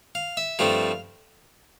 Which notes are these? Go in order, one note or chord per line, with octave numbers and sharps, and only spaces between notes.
F5
E5
G2 F3 A3 C4 F5